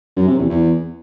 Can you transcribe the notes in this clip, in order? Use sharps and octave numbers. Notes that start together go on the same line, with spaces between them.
F#2
C3
E2
E2